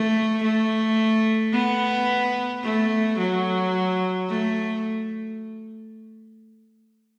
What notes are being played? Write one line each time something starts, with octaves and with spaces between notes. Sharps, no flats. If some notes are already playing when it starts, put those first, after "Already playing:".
Already playing: A3
A3
B3
A3
F#3
A3